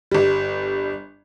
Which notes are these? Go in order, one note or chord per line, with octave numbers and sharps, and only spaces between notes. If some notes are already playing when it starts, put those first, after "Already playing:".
G1 G3